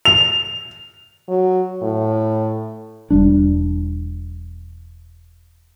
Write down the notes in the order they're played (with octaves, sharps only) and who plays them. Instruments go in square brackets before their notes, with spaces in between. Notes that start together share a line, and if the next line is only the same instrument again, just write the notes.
[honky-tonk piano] F7
[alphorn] F#3
A2
[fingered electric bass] E1 G3 D4